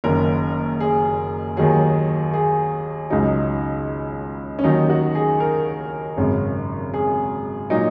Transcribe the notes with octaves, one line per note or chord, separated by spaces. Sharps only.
F#1 F#2 D#3 A#4
G#4
D#2 D#3 F#3 G#4
G#4
C#2 C#3 F#3 D#4
C#4
D#2 D#3 F#3 D#4
F#4
G#4
A#4
G#1 F#2 C#3
G#4
A#2 F#3 D#4